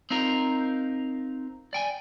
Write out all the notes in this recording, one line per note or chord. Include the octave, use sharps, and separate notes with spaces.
C4 D#4 F4 A#4
D5 G5 G#5